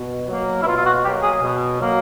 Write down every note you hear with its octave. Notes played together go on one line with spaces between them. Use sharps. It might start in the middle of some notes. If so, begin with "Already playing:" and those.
Already playing: B2
F#3 A#3
E4
B2 F4
F4
F#4
F#3 A#3 G4
G#4
B2
F#3 A#3